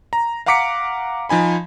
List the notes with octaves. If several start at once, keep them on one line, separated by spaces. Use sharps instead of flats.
A#5
F5 F#5 A#5 D6 B6 C#7
F3 D#4 G#5 B5